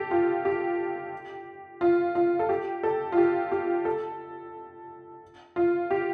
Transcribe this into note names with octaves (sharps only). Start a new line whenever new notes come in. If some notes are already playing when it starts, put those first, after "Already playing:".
Already playing: G4 A4
F4
G4
F4
F4
A4
G4
A4
F4
G4
G4
A4
F4
G4